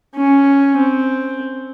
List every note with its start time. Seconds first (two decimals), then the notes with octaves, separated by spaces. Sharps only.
0.16 C#4
0.77 C4